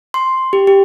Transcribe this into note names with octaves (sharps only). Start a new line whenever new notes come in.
C6
G4
G4